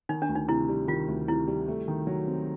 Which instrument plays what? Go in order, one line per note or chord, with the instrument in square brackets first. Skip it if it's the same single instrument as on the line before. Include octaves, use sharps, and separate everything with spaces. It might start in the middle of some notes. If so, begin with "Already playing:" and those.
[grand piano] D#3 [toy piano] D#4
[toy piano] D4
[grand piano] D2
[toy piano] D#4
[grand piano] C3 [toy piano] E4
[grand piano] G3
[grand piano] D#3 [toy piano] F4
[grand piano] D2
[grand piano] C3 [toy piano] E4
[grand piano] G3
A3
D#3
F#3
C4